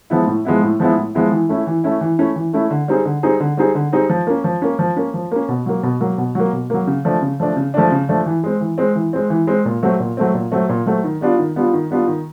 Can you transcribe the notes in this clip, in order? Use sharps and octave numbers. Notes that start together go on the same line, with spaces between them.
F3 G#3 B3 E4
A2
F3 G#3 B3 E4
A2
F3 G#3 B3 E4
A2
F3 G#3 B3 E4
E3
A3 C#4 E4
E3
A3 C#4 E4
E3
A3 C#4 E4
E3
A3 C#4 E4
D3
G3 C4 D#4 G#4
D3
G3 C4 D#4 G#4
D3
G3 C4 D#4 G#4
D3
G3 C4 D#4 G#4
F3
A#3 C#4
F3
A#3 C#4
F3
A#3 C#4
F3
A#3 C#4
B2
F#3 A#3
B2
F#3 A#3
B2
F#3 A#3
B2
F#3 A#3
C#3
F3 A3 D4
C#3
F3 A3 D4
C#3
F3 A3 D4
C#3
F3 A3 D4
E3
G#3 C4
E3
G#3 C4
E3
G#3 C4
E3
G#3 C4
A#2
F#3 A3 C4
A#2
F#3 A3 C4
A#2
F#3 A3 C4
A#2
F#3 A3 C4
D#3
G3 B3 D4 F4
D#3
G3 B3 D4 F4
D#3
G3 B3 D4 F4
D#3